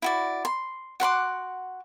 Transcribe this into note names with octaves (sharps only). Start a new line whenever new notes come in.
E4 F#4 D5
C6
F#4 F#5 C6 D6